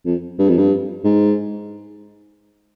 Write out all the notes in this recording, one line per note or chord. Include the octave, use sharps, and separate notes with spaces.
F2
G2
F2
G2
G#2